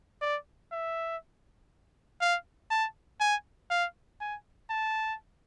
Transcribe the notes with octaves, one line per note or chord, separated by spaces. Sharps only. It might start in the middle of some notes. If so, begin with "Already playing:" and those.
D5
E5
F5
A5
G#5
F5
G#5
A5